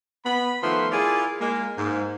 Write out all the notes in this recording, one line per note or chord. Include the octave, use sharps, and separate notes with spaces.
B3 B5
D#3 F3 A3 B3 E5 C6
E4 F4 G#4 A#4 D5
G#3 A#3
G#2 A#3